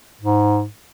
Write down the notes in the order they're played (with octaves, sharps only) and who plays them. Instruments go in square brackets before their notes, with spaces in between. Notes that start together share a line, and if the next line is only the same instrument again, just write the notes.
[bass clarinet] G#2